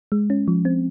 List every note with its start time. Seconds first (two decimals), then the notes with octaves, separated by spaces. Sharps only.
0.12 G#3
0.30 C#4
0.48 F3
0.65 C4